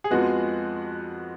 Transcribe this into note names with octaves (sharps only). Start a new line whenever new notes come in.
G#4
F2 F3 G#3 B3 F#4